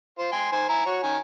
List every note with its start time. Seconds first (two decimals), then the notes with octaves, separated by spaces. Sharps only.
0.19 F4 C5
0.32 G5 G#5 C6
0.52 D#3 C5 G#5
0.69 E4 G#5 A#5
0.86 F#4 C#5
1.03 D#3 C#4 G#5